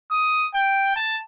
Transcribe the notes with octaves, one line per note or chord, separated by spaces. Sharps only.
D#6
G5
A5